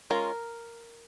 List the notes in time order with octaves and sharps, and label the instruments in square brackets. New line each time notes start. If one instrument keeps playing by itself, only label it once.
[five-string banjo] G#3 C#4 F4 A#4